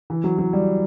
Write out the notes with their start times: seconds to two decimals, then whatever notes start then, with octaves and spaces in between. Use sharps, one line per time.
0.10 E3
0.24 F#3
0.38 F#3
0.53 G3